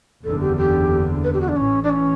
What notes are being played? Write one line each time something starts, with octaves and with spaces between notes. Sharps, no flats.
F#1 E2 D3 A4
G4
G4
B4
G4
F#4
D4
A1 A2 E3 C#4
D4
C#4